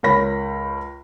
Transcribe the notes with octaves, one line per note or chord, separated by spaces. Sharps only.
C#2 A#4 C#5 B5 A#6